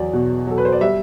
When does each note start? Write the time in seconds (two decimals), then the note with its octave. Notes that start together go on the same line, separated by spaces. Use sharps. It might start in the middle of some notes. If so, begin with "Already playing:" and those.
Already playing: E2 F#3 D5
0.13 B2
0.47 F#3 A4
0.58 B4
0.65 C5
0.72 D5
0.80 G3 E5